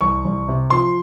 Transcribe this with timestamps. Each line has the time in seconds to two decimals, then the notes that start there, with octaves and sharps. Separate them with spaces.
0.01 C2 C#6
0.25 C2
0.48 C3
0.70 F3 C6